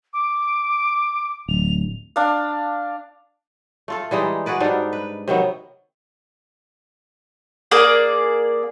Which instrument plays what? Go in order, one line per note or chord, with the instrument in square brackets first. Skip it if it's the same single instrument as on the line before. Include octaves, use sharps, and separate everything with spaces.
[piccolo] D6
[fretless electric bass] D1 [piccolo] F7
[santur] D4 F5
[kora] A3 F4 A4
E3 G3 G#3 D#4
F#4 G#4 B4 D5
G#2 G3 D4 D#4
B4
C3 D#3 F#3 B3
[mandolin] A#3 G#4 D5